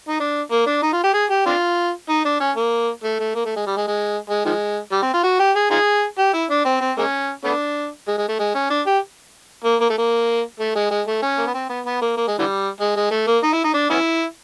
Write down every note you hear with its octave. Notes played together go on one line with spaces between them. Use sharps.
D#4
D4
A#3
D4
D#4
F4
G4
G#4
G4
C4 D4 F4
D#4
D4
C#4
A#3
A3
A3
A#3
A3
G#3
G3
G#3
G#3
G#3
D#3 F3 G#3
G3
C4
F4
F#4
G4
G#4
D#4 F4 G#4
G4
E4
D4
C4
C4
G#3 A#3 C#4
A3 B3 D4
G#3
G#3
A3
G#3
C#4
D4
G4
A#3
A#3
A3
A#3
A3
G#3
G#3
A3
C#4
A#3
B3
C4
B3
B3
A#3
A#3
G#3
D3 E3 G3
G#3
G#3
A3
A#3
D#4
E4
D#4
D4
B3 C#4 E4